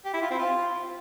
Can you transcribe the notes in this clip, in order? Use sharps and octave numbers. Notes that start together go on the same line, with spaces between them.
G4
E4
F4
C4
F4